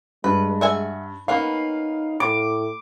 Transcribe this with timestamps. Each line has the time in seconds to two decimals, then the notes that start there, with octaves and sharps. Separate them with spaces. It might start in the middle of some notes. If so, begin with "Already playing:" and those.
0.24 G2 G#3 B4
0.61 F#4 E5 G#5
1.28 A#3 B3 C#4 D#4 F5
2.20 A2 D6